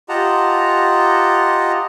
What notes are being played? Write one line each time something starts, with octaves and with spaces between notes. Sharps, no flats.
F4 G4 D#5 F#5 A5 A#5